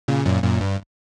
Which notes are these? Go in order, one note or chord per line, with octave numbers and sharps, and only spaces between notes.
A#2 C#3
F#2 A#2
F#2 A#2
G2